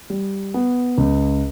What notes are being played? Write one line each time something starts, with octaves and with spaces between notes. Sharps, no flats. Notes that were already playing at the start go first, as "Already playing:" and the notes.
G3
B3
C#2